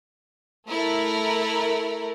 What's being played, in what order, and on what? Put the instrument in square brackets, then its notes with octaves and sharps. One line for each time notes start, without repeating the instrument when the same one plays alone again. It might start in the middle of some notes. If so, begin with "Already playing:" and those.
[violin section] A3 E4 A#4